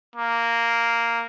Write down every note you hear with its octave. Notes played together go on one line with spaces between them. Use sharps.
A#3